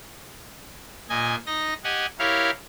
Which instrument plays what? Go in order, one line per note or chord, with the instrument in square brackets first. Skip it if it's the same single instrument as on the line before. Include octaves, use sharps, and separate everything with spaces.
[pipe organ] A#2 D#5 G#5
D#4 D#5 A#6
G4 D#5 F#5 G#5
E4 G4 A#4 C#5 F5